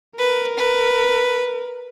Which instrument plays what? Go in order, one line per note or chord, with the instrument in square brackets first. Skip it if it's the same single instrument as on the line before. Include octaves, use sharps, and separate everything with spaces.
[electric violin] A#4 [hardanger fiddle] B4
[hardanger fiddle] B4